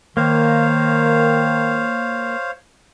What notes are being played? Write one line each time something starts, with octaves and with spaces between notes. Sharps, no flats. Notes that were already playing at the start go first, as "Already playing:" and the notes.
D#3 A#3 C5 C#5 F5